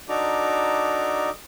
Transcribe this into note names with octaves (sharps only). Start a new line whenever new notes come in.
D4 D#4 F#4 A4 A#5 D6